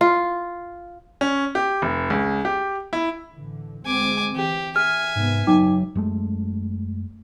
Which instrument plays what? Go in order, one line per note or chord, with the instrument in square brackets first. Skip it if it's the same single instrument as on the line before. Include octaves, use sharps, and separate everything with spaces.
[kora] F4
[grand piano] C#4
G4
F1
C#2
G4
E4
[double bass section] A2 D3 E3
[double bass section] D2 G#3 C4 [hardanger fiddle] G#5 D6
[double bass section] E3 [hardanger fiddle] G4
[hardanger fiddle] E5 G#5 [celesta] F6
[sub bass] G#2 [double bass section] C3 A#3 B3
[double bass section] F#1 G#2 [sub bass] F#3 [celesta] D#4 G5 D6
[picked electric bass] F#2 G#3 A3